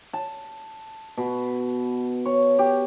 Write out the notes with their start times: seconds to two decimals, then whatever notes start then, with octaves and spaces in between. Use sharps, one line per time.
0.13 A5
1.17 B2
2.25 C#5
2.59 G4